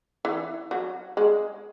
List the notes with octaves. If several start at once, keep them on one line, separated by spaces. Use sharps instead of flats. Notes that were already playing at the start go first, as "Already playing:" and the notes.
E3
F#3
G#3